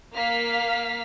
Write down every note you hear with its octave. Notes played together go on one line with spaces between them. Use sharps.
A#3 F5 F6 B6